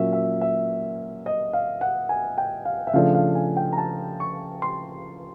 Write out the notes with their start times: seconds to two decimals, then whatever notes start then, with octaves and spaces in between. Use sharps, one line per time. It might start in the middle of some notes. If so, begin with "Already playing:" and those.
Already playing: A#2 F#3 A#3 C#4 E5
0.13 E5
0.41 E5
1.26 D#5
1.53 F5
1.81 F#5
2.09 G#5
2.38 G5
2.65 F5
2.87 E5
2.93 C#3 F3 A3 D4 F5
3.15 F5
3.35 G#5
3.57 G5
3.73 A#5
3.78 A5
4.20 C#6
4.62 C6